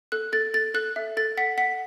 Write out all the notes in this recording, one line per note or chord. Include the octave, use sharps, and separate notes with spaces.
A4 F#6
A4 A6
A4 A6
A4 F#6
E5
A4 A6
F#5 B6
F#5 B6